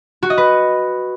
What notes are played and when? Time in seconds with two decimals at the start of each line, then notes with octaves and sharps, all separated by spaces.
0.22 F#4
0.30 D#5
0.38 B4